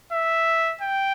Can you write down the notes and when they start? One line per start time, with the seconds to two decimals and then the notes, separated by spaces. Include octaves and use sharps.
0.12 E5
0.81 G5